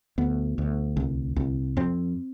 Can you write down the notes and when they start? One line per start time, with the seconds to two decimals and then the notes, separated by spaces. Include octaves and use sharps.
0.18 D2 B3
0.58 D2
0.97 C2
1.36 C2
1.77 F2 C4